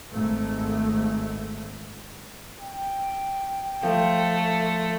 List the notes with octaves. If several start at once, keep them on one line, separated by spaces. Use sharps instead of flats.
G#1 G#2 A3
G5
F3 A3